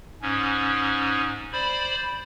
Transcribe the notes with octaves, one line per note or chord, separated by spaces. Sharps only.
G#2 C#4
C5 D5 B5